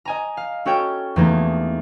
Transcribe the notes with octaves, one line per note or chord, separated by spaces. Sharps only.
D#5 G#5 A#5
F5
C#4 F#4 A4 C#5 G5
E2 E3 A3 A#3 D#4